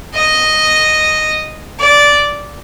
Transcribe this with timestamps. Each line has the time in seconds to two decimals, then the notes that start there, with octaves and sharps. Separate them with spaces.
0.15 D#5
1.80 D5